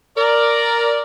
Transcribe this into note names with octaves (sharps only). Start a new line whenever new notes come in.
A#4 D5